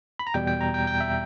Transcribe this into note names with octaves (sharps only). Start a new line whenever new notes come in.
B5
A#5
E2 B2 G3 G5
G5
A#5
G5
G5
E5